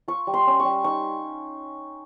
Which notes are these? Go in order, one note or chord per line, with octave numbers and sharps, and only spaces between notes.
F4 C#6
G3
C6
C#4
C#6
G3
D#4 C#6